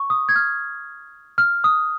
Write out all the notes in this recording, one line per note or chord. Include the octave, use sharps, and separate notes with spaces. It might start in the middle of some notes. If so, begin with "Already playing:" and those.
Already playing: C#6
D#6
G#6
F6
F6
D#6